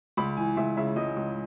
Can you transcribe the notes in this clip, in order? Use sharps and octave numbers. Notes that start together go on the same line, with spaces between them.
C#2 B5
E3 G#5
C#2 E5
C#3 E5
C#2 D#5
C#2